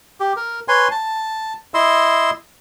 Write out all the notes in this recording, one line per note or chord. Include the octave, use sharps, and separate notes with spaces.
G4
A#4
B4 C#5 G#5 C6
A5
E4 D#5 C6 E6